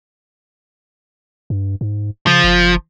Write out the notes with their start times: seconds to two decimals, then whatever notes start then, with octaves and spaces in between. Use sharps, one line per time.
1.50 G2
1.81 G#2
2.27 C#3 F3
2.44 F#1